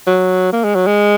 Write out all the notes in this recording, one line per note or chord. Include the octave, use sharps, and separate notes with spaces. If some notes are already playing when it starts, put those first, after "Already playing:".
F#3
A#3
G#3
F#3
G#3